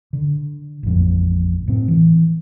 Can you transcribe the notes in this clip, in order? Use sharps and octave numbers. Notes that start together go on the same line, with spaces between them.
D3
A1 F2
A2 C4
E3